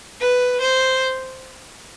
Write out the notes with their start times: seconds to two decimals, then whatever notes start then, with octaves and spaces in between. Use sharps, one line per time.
0.21 B4
0.61 C5